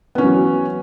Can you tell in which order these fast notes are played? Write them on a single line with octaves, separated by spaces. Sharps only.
B3 C#4 E3 F#3